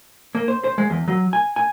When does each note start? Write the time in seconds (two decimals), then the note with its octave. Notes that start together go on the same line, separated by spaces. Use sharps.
0.35 A#3
0.48 C5
0.64 C5
0.78 G#3
0.90 E2
1.08 F#3
1.33 G#5
1.56 G#5